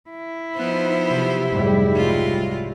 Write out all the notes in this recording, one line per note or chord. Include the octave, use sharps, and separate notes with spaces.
E4
F3 B3 D#4 C5 F#6
C3 F#3 G4
F1 G#2 G3
C2 G#3 F4 C#5